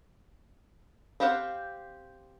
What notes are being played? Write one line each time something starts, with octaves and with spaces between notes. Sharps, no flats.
C4 G4 C5 F5 F#5